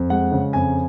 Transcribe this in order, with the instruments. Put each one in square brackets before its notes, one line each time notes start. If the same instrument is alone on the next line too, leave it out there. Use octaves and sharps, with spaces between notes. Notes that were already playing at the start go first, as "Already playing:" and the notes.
Already playing: [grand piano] F2
G#3 F#5
C#3
F2 G#5